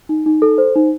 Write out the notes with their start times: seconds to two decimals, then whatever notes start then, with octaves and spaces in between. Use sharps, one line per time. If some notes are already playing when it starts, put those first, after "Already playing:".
0.09 D#4
0.26 D#4
0.42 A4
0.58 C5
0.76 D#4